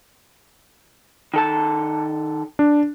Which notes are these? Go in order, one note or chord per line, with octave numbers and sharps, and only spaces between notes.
D#3 A4 A5
D4